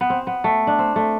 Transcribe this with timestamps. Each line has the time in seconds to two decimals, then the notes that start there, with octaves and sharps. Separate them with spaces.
0.01 B3
0.10 C4
0.27 B3
0.44 A3
0.67 D4
0.79 C4
0.96 A3